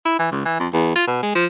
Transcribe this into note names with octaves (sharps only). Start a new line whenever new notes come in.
E4
E3
C#2
E3
F2
E2
F4
B2
G#3
F3